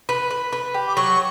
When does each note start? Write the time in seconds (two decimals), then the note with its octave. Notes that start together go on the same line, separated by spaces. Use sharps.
0.09 B4
0.31 B4
0.53 B4
0.74 G4
0.87 D6
0.96 F#3 C#6